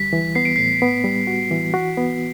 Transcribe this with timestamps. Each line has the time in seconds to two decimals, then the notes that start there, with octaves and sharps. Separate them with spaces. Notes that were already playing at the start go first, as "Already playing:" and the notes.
Already playing: D2 G3 B6
0.13 E3
0.35 B3 C7
0.45 D7
0.56 A2 C7
0.82 B3
1.04 G3
1.27 F#4
1.51 E3
1.74 F#4
1.97 B3